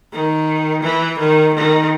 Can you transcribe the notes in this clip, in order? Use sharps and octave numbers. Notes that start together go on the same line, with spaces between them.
D#3
E3
D#3
D#3